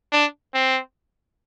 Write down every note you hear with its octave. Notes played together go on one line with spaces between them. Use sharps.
D4
C4